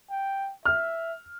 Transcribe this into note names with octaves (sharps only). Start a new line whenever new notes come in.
G5
E5 F6